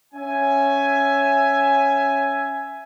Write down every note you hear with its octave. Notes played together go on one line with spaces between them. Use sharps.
C#4 E5 G#5